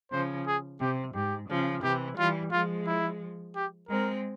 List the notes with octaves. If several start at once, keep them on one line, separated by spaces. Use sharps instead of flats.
C#3 F3 C5
G#4
C3 G4
G#2 G4
C#3 F3
C3 E3 G4
E3 G3 F4
F3 G#3 F4
E4
G4
G#3 C4 A#4